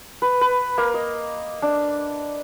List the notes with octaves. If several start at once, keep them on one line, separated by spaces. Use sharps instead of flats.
B4
B4
A#3
D#5
D4